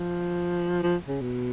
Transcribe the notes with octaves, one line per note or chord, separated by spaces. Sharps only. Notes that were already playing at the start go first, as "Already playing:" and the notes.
Already playing: F3
F3
C#3
B2